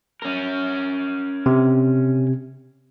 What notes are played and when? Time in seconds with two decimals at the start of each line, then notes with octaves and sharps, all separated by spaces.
0.22 C#4 A#4
1.46 C3